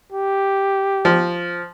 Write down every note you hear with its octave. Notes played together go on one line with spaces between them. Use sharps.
G4
F3